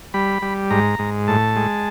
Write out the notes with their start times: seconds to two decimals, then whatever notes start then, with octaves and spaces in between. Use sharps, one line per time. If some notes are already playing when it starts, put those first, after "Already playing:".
0.14 G3 B5
0.42 G3
0.70 G#2 A#5
0.99 G#2
1.27 A2 A5
1.56 G#3